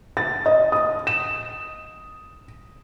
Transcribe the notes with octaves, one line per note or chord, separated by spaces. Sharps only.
A6
D#5
D#6
E7